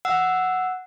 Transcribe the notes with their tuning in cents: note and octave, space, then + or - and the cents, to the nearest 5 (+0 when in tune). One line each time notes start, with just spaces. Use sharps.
F#5 +0 E6 +0